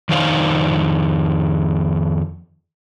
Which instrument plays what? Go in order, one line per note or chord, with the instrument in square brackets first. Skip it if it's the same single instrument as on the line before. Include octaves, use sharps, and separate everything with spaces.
[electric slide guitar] F2 D#3 D4 D#4 C5 F5